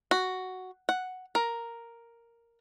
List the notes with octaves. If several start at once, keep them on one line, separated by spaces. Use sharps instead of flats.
F#4
F#5
A#4